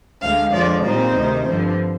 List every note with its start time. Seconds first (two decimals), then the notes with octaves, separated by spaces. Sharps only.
0.21 D2 D3 G#3 F5
0.52 F2 D3 F3 G#3 D5
0.84 A#2 G3 C4 D#4 C5
1.15 D2 C3 D#3
1.46 G2 D3 F3 C4